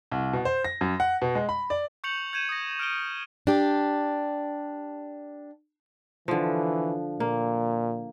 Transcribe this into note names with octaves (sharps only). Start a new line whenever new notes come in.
C2
B2
C5
A#6
F#2
F#5
B2
G#3
B5
D5
C#6 G6 C#7 F7 F#7
G6 G#6 D#7 E7
D#6 A#6
F6 D7 D#7 G7
D4 G4
D3 E3 F3
A#2 A#3